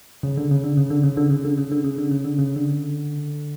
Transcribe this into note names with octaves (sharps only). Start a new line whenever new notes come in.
C#3
D3
C#3
D3
C#3
D3
C#3
D3
C#3
D3
C#3
D3
C#3
D3
C#3
D3
C#3
D3